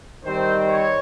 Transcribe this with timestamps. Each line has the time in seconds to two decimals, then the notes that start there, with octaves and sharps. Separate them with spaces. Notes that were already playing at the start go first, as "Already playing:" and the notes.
0.25 D#3 G3 C4 C5
0.67 C#5